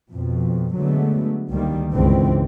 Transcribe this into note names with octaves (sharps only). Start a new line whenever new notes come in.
F2 B2
D3 F#3 G#3 A3 B3
D2 D#3 G3 A#3
C#2 G2 D3 E3 C4